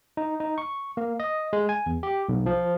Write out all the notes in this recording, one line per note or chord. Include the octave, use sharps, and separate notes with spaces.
D#4
D#4
C#6
A#3
D#5
G#3
G#5
E2
G4
B1
F3